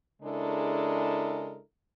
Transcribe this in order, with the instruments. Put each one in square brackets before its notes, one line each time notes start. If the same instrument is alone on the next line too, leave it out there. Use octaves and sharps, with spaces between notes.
[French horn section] C#3 G#3 D4 E4 A4 A#4